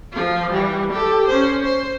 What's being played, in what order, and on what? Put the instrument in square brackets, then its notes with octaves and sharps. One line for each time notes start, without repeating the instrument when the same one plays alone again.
[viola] F3 F4
E3 G3
G4 A4
C#4 C5
C5